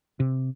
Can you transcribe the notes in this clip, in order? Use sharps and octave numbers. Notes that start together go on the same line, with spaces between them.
C3